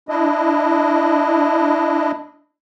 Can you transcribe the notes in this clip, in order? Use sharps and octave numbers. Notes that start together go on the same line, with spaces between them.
D4 E4 D#5